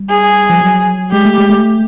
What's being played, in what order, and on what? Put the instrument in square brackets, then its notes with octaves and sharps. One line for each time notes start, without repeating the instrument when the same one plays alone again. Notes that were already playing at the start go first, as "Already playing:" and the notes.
Already playing: [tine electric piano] G3
[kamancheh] G#4
[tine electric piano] F3
F#3
[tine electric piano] G#3 [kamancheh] G4
[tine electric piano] A3
G#3
A3